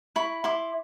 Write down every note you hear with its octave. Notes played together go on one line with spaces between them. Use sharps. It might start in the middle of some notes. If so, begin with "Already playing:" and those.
E4 B5 C#6
E4 C6 D6